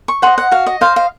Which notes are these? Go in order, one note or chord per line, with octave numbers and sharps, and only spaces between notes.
C#6
C5 D#5 F#5
F#5
F#4 F5
D#5
C5 D#5 F5
F5